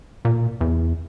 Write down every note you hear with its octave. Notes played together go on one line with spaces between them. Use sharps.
A#2
E2